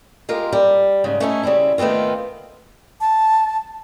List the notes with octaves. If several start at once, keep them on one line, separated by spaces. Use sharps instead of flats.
G#3 F4 G4 A#4
G3
G#2 C#3 G3
A3 C#4 D#4 E4
C#3 G3 C4 E4
D#3 A3 B3 C4 F4
A5